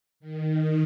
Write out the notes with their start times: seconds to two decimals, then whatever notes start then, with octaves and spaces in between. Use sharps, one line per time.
0.20 D#3